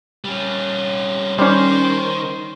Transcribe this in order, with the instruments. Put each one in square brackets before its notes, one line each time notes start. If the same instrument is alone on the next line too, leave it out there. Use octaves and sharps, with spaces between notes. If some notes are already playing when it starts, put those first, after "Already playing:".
[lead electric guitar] G3 C#4
[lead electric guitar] D#3 [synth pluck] G3 C#4 [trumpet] C5